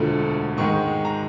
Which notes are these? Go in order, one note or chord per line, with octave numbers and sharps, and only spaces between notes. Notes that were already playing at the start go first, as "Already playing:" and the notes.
Already playing: E1 D2 D3 F3 A3
G#2 D#3 G#3 C#6
A#5